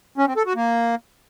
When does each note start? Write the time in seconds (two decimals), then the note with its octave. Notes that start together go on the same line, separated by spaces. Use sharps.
0.18 C#4
0.27 C4
0.36 A4
0.46 F#4
0.55 A#3